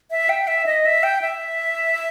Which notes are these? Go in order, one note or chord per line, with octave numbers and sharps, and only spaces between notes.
E5
G5
E5
D#5
E5
G5
E5